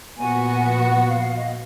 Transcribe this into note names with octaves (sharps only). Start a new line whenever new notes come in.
A#2 F3 B3 F#4 G#5
F#5
F#5
F5
F5
D#5